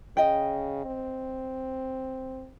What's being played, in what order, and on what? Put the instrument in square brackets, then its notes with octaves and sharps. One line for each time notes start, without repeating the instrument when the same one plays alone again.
[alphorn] C#3 [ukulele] D#5 G5
[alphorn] C4